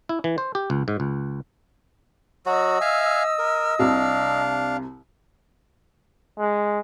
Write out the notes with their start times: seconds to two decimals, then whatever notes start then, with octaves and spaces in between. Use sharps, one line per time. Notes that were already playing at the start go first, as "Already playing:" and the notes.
0.09 E4
0.24 E3
0.38 C5
0.55 G4
0.70 C#2
0.88 G#2
1.00 C#2
2.46 F#3 F#4 D#5 D#6 E6
2.81 E5 F5 G#5
3.39 A#4
3.79 C2 C3 D4 F5
6.38 G#3